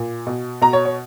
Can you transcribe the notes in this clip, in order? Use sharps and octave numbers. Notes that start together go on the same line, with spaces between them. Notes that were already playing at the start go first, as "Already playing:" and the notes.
Already playing: A#2
B2
B2 A#5
C#5
C#5